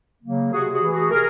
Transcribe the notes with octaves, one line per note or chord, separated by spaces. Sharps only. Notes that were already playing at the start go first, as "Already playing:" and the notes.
C#3 F#3 A#3
C3 F#4 G#4
F#4 G#4
E3 A3
F#4 G#4
C3 G#4 A#4